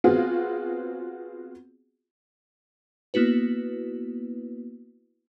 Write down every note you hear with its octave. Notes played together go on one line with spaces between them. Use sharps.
B3 C4 F4 F#4 G#4
A#3 B3 E4 F#4 B4